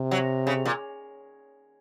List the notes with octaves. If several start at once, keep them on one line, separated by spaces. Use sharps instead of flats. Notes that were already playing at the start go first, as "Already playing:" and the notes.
Already playing: C3
F#3
C#3
A#2